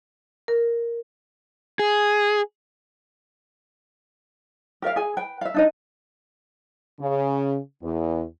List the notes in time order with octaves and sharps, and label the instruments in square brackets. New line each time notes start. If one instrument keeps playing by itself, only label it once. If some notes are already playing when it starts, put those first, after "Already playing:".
[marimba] A#4
[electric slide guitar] G#4
[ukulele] G4 A#4 E5 F5
G#4 G#5
B4 G5
E5 F5
D4 D#4 D#5
[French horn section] C#3
E2